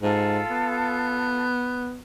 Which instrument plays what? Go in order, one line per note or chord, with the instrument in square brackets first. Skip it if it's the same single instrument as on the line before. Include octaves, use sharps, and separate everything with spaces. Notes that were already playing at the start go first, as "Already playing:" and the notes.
[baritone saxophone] G#2 [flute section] F4 A4
[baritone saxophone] B3